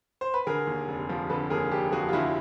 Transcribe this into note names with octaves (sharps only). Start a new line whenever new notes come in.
C5
B4
D3 G#4 A#4
D#2
F1
F3
D3 A4 B4
D#2 G#4 A#4
F1 G4 A4
F3 F#4 G#4
F4
D3 E4 F#4